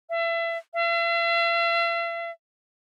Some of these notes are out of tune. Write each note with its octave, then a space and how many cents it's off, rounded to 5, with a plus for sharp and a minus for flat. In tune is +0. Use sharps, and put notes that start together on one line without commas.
E5 +30
E5 +45